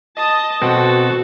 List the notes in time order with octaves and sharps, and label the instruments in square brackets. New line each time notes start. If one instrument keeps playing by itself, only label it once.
[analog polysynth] D#5 [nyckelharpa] A5 D#6
[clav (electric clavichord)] B2 C4 [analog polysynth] F#4 [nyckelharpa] A4